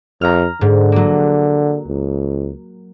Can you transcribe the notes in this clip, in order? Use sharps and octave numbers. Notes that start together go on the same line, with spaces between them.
F2 A#5 F6
G#2 D3
F#3 A#3
C#2